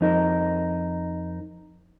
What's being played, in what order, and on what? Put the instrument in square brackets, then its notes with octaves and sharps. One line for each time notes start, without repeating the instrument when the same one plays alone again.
[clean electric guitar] F2 D#4 A#4